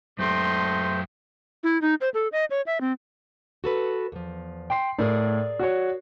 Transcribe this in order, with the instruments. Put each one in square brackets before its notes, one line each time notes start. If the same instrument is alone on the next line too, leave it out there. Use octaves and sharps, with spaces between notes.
[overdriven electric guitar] F#2 G4 [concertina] A3 C5 [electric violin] D#5 C6
[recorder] E4
D#4
C5
A4
D#5
C#5
E5
C4
[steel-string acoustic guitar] F#4 A4 B4
E2 F3
[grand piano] G5 C6 C7
[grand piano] A2 [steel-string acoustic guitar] G#4 A#4 D5
[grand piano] F#4 C#5